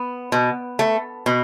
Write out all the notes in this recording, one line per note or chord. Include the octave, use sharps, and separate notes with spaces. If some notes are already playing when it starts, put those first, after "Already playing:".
Already playing: B3
B2
A3
B2